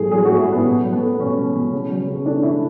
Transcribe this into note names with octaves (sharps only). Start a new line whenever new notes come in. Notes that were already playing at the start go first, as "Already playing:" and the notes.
Already playing: A2 F#3 A3 G#4
F#3 G#4
A2 F#4
E4
A2 B3
B2
F#3
B3
A3
B2 C#4
B2
B2
C#3
F#3
C#3
A3 D4
C#3 E4